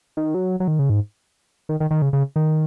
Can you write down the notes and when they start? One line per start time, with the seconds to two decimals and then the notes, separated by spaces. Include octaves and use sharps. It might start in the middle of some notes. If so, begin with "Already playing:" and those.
0.17 D#3
0.34 F#3
0.60 F#3
0.68 D#3
0.79 C#3
0.90 G#2
1.69 D#3
1.80 D#3
1.91 D#3
2.02 C#3
2.13 C#3
2.36 D#3